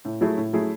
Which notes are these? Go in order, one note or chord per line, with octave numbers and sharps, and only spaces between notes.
A2
F#3 A3 E4 G#4
A2
F#3 A3 E4 G#4